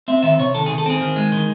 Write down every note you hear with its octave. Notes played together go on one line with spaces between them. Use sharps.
C4 E5
D#3 E5
C3 C#5
D#3 A4
G#4
D#3
A4
C4 G#4
D#3
G#3
D#3